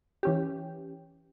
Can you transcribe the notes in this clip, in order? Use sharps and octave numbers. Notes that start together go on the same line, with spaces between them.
E3 C#4 G4